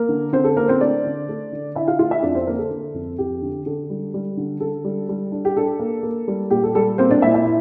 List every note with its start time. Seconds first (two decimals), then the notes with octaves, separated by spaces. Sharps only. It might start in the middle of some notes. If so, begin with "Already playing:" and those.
Already playing: A#3 A#4
0.09 D3
0.32 D3 C4 C5
0.44 A4
0.57 D3 A#3 A#4
0.68 C4 C5
0.81 A3 D4 D5
1.04 D3
1.29 A3
1.52 D3
1.75 D3 E4 E5
1.88 F4 F5
1.99 A3 F4 F5
2.11 E4 E5
2.23 F2 D4 D5
2.35 C4 C5
2.46 D3 A#3 A#4
2.59 A4
2.70 D3
2.94 F2
3.18 F2 G4
3.42 D3
3.66 D3 A4
3.90 G3
4.14 G3
4.37 D3
4.60 D3 A4
4.84 G3
5.09 G3
5.32 D4
5.45 G4
5.57 D4 A4
5.79 A#3
6.03 A#3
6.28 G3
6.51 A#2 G4
6.64 A4
6.75 G3 A4
6.98 A#3 C4 C5
7.11 D4 D5
7.22 A#2 E4 E5
7.34 E4 E5
7.46 E4